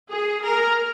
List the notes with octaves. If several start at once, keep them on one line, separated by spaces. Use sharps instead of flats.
G#4
A#4